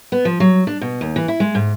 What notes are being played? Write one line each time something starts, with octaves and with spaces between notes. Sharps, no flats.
B3
F3
F#3
D4
B2
D#2
E3
E4
G#3
G#2